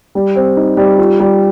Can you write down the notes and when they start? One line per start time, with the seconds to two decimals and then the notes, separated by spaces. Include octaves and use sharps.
0.15 G3
0.35 C4
0.57 D#4
0.77 G3
0.98 F4
1.20 G3